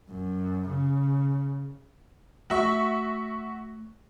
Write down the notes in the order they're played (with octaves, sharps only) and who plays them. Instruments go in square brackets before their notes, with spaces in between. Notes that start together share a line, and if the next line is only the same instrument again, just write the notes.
[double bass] F#2
C#3
[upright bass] A3 [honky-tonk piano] F#4 E5 C#6